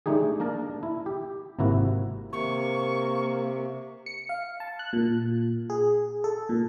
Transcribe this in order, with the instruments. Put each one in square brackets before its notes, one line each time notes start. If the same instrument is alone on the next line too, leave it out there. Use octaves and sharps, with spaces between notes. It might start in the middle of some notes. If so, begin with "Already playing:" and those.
[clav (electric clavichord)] G#3 A3 D4 D#4 G4 G#4
A#3 D4 A#4 D5 A5
E4
G4
G#1 C3 A#3 E4 F#4
[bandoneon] C3 [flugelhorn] A#3 [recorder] C#6
[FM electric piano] C#7
F5
A5
F#6
A#2
G#4
A4
A#2